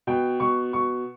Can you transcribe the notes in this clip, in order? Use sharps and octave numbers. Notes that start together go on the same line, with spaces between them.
B2 G5
B2 C#6
B2 C#6